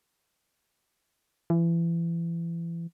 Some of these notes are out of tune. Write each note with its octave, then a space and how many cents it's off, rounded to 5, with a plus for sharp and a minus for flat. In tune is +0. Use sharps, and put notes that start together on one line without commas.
E3 +30